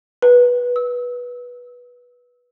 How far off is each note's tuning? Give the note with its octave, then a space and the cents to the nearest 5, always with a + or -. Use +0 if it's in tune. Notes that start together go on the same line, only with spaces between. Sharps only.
B4 -15
E6 -25